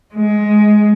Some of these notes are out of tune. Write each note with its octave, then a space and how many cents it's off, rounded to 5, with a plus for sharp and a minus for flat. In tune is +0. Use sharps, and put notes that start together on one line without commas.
G#3 +15